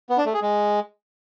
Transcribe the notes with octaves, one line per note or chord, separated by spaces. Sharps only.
B3
D4
A3
G#4
G#3